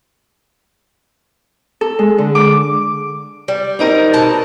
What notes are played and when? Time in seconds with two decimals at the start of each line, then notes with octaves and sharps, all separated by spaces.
1.81 A4
1.99 G#3
2.18 D3
2.35 D6
3.48 G3
3.79 C4 D#4 A#4
4.13 B2 A5